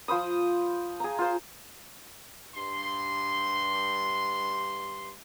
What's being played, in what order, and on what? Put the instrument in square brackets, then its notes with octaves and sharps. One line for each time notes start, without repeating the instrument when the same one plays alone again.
[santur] F3 C5 B5 D#6
G#4 A#5
F4 C5
[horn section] G2 C6